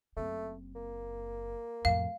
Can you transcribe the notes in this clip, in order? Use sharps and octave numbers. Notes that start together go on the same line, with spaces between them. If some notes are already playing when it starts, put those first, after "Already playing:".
F#1 A3 C4
A#3
F2 A2 F5